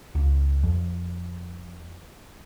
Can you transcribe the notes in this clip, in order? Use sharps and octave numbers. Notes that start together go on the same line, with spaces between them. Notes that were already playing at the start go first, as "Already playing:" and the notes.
C#2
F2